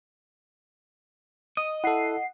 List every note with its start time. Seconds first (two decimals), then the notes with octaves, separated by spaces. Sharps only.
1.57 D#5 D#6
1.84 E4 A4 F#5 C7